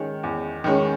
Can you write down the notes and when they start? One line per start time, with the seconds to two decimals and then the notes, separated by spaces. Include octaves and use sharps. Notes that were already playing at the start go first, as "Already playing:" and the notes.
Already playing: D#3 G#3 C#4
0.23 E2
0.64 D#3 G#3 C#4